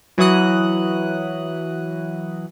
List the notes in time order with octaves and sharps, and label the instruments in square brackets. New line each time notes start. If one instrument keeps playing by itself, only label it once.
[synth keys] E3 F#3 E4 F#4 D#6 F#6